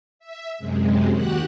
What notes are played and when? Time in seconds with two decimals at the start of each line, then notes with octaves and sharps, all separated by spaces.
0.19 E5
0.59 F#2 C3 G#3
1.13 D#2 F#4 G4 F#5 F#6